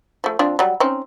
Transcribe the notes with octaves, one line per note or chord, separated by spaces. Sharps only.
F3 A3
F3 C4 D4
F#3 G3
C4 C#4 D#4